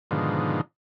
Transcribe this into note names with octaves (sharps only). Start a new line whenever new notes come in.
G#2 B2 D3 D#3 F3